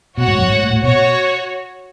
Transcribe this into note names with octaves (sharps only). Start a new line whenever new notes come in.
B2 F#4 C#5 F#5
G#2
F#2
G#2
A2
A2
B2 F#4 C#5